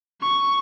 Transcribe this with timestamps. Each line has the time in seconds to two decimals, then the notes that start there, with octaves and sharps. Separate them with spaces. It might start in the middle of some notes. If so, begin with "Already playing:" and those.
0.21 C#6